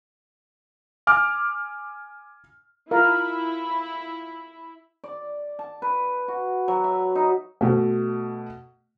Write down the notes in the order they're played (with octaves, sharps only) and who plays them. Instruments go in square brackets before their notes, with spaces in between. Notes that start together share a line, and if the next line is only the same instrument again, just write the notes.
[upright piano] G#5 D6 F6
[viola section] E4 [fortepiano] F4 [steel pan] A#4
[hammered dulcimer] D5
A5
B4
F#4
F#3
E5
D#4
[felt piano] B2 A3